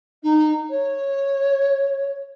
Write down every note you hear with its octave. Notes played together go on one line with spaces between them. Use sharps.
D#4
C#5